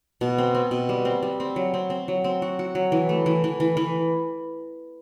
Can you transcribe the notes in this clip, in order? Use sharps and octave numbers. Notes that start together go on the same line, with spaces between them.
B2
C4
C4
B2
G3
C4
G3
C4
F#3
C4
C4
F#3
C4
F#4
F#4
F#3
E3
A3
E3
E3
E3
E3